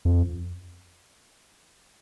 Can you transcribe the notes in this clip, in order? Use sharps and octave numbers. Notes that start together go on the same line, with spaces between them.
F2